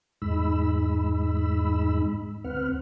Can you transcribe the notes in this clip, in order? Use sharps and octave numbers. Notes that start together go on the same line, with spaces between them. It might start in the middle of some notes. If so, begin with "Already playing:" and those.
E2 G#2 G#3 D#4 B5 E6
D2 C4 B4 F#5 F6